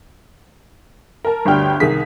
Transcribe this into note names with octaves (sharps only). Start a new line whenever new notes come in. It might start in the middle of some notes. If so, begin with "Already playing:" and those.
A#4 A5
G1 D2 G3 G5 F6
C2 D#3 G#4 B6